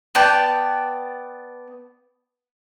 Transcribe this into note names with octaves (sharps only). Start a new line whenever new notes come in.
B3 D5 G5 A5